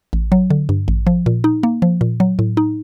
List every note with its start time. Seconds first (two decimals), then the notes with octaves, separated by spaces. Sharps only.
0.13 A1
0.32 F#3
0.50 D3
0.69 G2
0.88 A1
1.07 F3
1.26 A#2
1.44 D#4
1.63 A#3
1.82 F3
2.01 A#2
2.20 F#3
2.39 A2
2.57 D#4